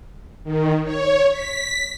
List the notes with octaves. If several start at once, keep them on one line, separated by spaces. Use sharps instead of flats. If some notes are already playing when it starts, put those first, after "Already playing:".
D#3
C#5
B6